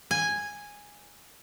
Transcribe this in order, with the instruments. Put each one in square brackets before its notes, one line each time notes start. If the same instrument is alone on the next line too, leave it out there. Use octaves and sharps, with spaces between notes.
[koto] G#5